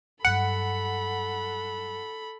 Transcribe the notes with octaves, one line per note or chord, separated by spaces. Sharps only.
G2 F#3 A4 F#5 B5